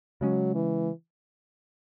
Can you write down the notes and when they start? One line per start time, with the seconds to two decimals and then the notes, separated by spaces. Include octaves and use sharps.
0.21 C#3 F#3 G#3 C#4
0.55 E3